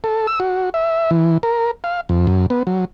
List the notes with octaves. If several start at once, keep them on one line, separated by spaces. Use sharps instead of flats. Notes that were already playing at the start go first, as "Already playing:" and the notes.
A4
E6
F#4
E5
E3
A#4
F5
F2
F#2
B3
F#3